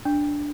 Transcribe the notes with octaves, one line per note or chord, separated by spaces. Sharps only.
D4